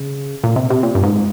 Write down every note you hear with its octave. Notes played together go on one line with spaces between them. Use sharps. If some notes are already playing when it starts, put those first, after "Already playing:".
Already playing: C#3
A#2
C3
C3
A#2
G2
G#2